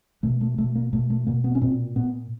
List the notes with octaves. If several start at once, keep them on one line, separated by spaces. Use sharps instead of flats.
B2 A3
A3
B2 A3
A#3
B2 A3
A3
B2 A#3
B3
C#4
A#2 C4
A#2 B3